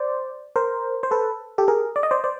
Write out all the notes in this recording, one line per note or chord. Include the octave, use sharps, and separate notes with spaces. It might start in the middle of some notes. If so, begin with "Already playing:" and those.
Already playing: C5 D5
A#4 C5
C5
A4 B4
G4 A4
G#4 A#4
D5
D#5
C5 D5
C5 D5